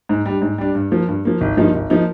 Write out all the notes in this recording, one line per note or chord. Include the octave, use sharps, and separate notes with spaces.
G#2
G3 D4
G#2
G3 D4
G2
F3 A#3
G2
F3 A#3
G#1
G2 F3 A#3 D#4
G#1
F3 A#3 D#4